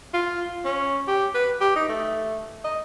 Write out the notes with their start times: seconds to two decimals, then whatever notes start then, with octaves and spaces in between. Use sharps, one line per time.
0.14 F4
0.65 C#4
1.08 G4
1.34 B4
1.61 G4
1.76 D#4
1.89 A3
2.64 D#5